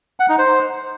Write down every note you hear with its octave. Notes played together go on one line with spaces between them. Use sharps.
F#5
D#4
C5